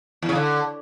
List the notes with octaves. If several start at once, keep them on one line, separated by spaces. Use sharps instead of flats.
E2
C#3
D3